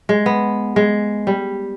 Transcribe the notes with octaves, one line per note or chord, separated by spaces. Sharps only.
G#3
B3
G#3
G3